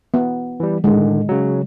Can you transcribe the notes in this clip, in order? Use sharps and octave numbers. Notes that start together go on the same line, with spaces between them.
B3
E3 G3
A2 D3 D#3 G#3
C#3 F#3